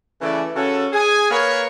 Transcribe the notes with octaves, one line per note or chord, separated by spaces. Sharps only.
C#3 E3 A3 A4 B4 D5
C#3 C#4 F#4 A4
G#4 G#5
A#3 A#4 B4 C#5